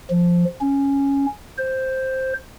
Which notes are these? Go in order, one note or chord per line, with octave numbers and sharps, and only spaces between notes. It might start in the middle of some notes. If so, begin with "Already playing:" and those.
F3
C#4
C5